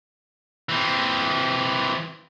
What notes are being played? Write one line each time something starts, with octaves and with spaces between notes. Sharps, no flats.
E3 C4